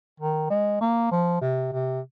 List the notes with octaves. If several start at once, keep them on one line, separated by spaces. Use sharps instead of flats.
D#3
G#3
A#3
F3
C3
C3